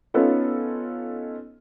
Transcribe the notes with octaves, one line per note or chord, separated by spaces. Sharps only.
B3 C#4 D#4 F4 A4